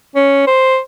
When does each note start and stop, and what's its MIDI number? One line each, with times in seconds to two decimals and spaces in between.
0.15 0.43 61
0.47 0.79 72